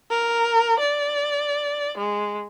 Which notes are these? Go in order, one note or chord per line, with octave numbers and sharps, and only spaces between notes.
A#4
D5
G#3